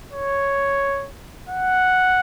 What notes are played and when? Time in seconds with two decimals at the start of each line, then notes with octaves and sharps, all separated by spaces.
0.13 C#5
1.49 F#5